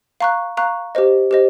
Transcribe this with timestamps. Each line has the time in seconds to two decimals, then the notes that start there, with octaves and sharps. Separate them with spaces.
0.20 F5 A#5 C#6 F#6
0.57 F5 A#5 C#6 F#6
0.95 G4 C5 D#5
1.31 G4 C5 D#5